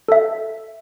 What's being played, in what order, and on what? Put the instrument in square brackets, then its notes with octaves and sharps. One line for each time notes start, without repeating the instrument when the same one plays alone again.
[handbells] A4 E5